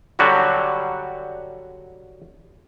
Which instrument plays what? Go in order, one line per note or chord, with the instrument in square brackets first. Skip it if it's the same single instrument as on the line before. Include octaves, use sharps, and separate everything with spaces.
[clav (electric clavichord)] D3 F#3 G3 F#4